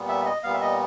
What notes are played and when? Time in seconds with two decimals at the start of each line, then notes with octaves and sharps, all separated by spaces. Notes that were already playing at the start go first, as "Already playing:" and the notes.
Already playing: A#2 G3 B3
0.09 E5
0.26 D#5
0.44 A#2 G3 B3 F5
0.54 E5
0.61 D#5